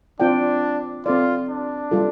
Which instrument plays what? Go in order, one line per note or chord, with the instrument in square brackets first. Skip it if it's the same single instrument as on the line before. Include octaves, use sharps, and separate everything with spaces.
[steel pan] C4 F4 D5 G5 [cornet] D4
[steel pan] C4 A4 D5 [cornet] F4
[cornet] D4
[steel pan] G3 F4 A4